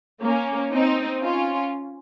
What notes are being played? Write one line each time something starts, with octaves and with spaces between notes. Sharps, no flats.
A#3 C#4
C4 D#4
C#4 F4